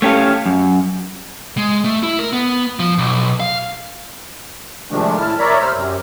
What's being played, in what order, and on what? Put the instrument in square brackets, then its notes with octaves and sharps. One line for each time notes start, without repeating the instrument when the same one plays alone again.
[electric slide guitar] A3 C#4 G4 A4 F5
F#2
[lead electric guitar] G#3
A3
E4
A#4
B3
F3
B1
F5
[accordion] C3 D#3 F3 G#3 A3 D4
A2 E4 A5 F6
A#4 C#5 D5 E5 A#5 B5
C3 C5 E6 F6
F#2 C3